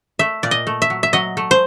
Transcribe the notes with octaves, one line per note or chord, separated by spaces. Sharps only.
A3 E5
A#2 D5
D#5
A3
E5
F#3
E5
F#3 D#5
A3
C5